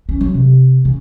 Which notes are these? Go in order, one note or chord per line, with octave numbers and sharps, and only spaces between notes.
C#4
F#3
C3
C#3